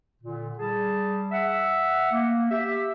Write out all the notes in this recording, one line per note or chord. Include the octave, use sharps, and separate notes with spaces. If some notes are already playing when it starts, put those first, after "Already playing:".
A#2 D3
G3 G#4 A5
E5 F#5
A#3
G4 E5